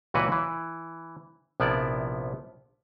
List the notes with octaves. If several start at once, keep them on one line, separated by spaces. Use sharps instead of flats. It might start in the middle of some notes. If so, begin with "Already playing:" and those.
C#2 A#2 E3 F#4 B4
E3
A#1 C3 F3 B3 E4 D5